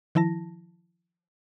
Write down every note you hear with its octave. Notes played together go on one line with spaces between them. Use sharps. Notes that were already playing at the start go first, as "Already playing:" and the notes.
D#3 F3 E4 A5 A#6